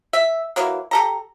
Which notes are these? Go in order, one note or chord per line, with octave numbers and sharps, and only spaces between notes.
E5
E3 F#3 A#3
G4 A4 A#5